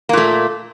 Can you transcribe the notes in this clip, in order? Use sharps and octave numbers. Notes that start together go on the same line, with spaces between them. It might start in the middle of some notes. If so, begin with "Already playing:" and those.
A#2 A3 A#3